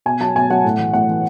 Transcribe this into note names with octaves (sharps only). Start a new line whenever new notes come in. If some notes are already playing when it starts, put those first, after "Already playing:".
B2 G#5
F#3 A5
B2 G#5
F#3 F#5
A2
E3
A2 F#5
E3